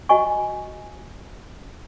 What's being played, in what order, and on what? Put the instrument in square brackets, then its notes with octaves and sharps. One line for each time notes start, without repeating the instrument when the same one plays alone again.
[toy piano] F#4 D#5 G#5 C#6